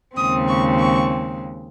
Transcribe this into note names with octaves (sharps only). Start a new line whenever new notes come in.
D#2 C#3 G#3 C4 D#6
C#6
C#6